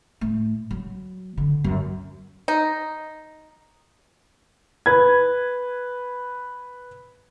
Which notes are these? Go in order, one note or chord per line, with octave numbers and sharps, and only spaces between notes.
A2
F#3
D3
F#2
D#4
B4 G#6